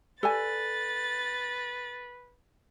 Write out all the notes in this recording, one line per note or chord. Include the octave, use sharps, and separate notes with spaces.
A4 B4 D5 G#5 A6